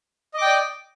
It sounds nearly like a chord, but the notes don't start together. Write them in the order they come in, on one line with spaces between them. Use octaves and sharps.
D#5 D6 G5 D5